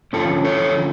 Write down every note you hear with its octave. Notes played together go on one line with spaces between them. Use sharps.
D3 F3 A3 C#4 F4 A4
A4 C#5